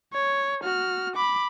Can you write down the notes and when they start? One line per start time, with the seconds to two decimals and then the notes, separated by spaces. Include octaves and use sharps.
0.13 C#5
0.63 F#4 F6
1.16 B5 D6